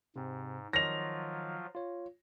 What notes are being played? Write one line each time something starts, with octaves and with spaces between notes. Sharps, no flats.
G#2 C3 C4
D#3 F3 F#3 F4 C#5 D#5 A#6 F7
F4 C#5